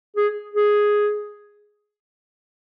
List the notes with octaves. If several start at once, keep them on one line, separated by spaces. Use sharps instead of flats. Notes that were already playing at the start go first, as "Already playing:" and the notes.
G#4
G#4